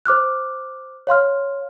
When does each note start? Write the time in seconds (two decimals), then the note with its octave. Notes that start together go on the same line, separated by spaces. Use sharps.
0.05 C5 D6 F6 F#6
1.07 C#5 F5 C6 F6